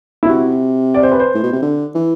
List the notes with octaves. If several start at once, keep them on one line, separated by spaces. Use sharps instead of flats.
E4
C3 F#4
D5
C5
B4
C5
A2
B2
C3
D3
E3